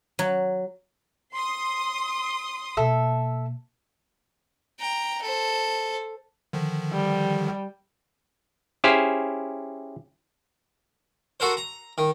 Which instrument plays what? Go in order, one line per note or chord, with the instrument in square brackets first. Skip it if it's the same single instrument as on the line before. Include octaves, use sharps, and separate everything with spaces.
[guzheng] F#3
[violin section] C6 D#6
[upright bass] B2 A#3 [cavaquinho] A4 E5
[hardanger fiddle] G5 A#5
A4 C5
[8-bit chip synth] D3 D#3 F3
[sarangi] G3
[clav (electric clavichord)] C#4 E4 G4 G#4 C5 F5
[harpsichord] F#4 A4 A#4 C5
A#5
D#3